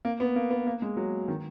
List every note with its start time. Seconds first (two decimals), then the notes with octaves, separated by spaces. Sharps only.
0.05 A#3
0.20 B3
0.36 A#3
0.50 B3
0.67 A#3
0.82 G#3
0.97 F#3
1.28 D#3